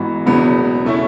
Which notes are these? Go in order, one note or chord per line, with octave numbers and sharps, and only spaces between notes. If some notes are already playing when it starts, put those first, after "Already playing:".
Already playing: A1 G#2 E3 B3 F#4
E1 E2 C#3 F#3 B3
B2 A3 C#4 E4